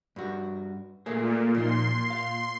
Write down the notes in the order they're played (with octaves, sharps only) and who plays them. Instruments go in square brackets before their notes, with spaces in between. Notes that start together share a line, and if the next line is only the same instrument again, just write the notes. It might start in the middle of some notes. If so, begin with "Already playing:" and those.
[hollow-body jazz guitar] G2 F#4
[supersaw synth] A#2 [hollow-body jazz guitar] A3 A#3 G#4
[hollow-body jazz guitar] A#2 F3 D#4 [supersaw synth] C6
[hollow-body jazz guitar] F5